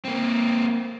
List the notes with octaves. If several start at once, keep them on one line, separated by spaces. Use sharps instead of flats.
A#3 C4